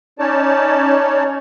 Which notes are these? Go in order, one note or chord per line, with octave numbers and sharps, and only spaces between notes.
C#4 D#4 C#5 D5 A5